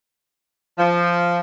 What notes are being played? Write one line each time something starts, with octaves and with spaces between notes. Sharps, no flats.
F3